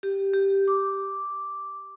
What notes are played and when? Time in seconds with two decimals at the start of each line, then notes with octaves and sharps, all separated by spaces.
0.03 G4
0.33 G4
0.68 D6